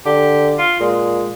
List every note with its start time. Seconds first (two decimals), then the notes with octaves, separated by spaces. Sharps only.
0.06 D3 G4
0.58 F4
0.80 A#2 G#3